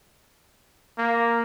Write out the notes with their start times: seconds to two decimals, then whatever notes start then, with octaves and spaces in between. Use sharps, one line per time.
0.98 A#3